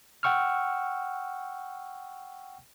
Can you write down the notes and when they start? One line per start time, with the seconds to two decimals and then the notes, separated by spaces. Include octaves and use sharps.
0.23 F#5 G5 C#6 E6 F6